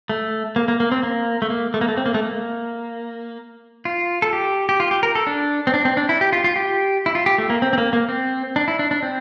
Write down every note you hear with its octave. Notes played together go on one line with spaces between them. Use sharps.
A3
A#3
A#3
A#3
C4
A#3
A3
A#3
A3
A#3
A3
C4
A#3
A3
A#3
F4
A4
G4
G4
F4
G4
A#4
A4
D4
C4
D4
C4
D4
E4
G4
F4
F4
G4
E4
F4
G4
A3
A#3
C4
C4
A#3
A#3
C4
D4
E4
D4
D4
C4